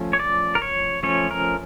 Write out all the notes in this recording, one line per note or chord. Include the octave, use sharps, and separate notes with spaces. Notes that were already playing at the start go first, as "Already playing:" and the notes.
Already playing: F3 A3 C#4
C#5
D5
A#4
C#5
F3 A3 C#4 C#5
A#4